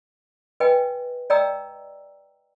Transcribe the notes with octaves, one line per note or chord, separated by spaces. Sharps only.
B4 D#5 G5 G#5
D5 D#5 G5 A#5 E6